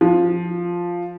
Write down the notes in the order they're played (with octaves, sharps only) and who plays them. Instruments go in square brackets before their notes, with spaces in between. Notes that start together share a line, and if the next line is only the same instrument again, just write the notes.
[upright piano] F3